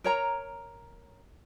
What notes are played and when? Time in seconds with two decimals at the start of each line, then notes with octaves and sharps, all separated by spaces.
0.04 A#4 C#5 A#5